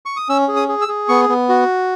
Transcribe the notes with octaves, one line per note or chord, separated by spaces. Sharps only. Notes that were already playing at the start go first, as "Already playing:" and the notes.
C#6
D#6
C#4 E6
G#4
D#6
G#4
E6
G#4
B3 C#6
B3
F#4